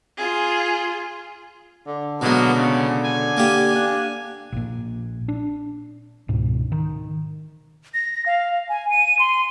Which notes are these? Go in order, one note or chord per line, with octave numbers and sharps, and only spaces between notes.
F4 G#4
D3
B2 F#3 G#3 A#3 B3
C#3
G#5
A#3 G4
D4
A#1 A#2
D4
C#2 G#2 B2
D#3
A#6
F5
G#5
D#7
C6